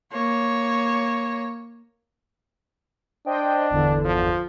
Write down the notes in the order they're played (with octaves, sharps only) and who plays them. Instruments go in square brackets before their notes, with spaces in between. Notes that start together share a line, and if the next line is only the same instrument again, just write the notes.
[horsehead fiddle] A#3 C#5
[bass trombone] D4 [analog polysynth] C5 D#5 G5
[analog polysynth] G1 E2 D3
[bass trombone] F3